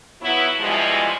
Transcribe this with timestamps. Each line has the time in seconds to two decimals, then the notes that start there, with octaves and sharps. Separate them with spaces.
0.21 F#3 B3 E4
0.59 B2 E3 F3 G3 G#3